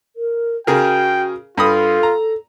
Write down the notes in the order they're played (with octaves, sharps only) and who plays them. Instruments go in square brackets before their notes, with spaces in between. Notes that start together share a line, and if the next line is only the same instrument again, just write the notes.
[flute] A#4
[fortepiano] C#3 G#4 A#4 [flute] F#4 [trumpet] G5
[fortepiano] G2 B5 D#6 [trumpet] F4 [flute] A4
[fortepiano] A#5